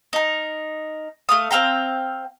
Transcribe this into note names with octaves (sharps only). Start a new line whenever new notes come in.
D#4 A#4
A3 F5 D#6
C4 F5 G5 A#5